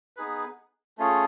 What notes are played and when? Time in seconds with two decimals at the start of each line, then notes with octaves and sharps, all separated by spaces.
0.17 B3 D#4 G#4 B4
0.98 A3 C#4 F4 G#4